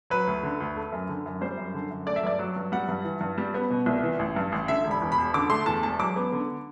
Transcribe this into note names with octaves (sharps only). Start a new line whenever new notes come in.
F#3 B4
D2
D3
D2
A3
F#2
D3
F#2
G3 C5
F#2
D3
F#2
A3 D5
E5
G2 D5
F#3
G2
G3 F#5
G2
E3
G2
G3
B3
B2
C2
E3
A1
G2
A1
D3 E5
E1
B5
E2
B5
E1
D3 D6
A3 C6
E2 A5
E1 A5
F#3 D6
B3
D3